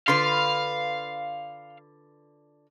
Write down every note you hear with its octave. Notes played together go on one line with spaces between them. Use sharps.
D3 F4 B4 F5 C6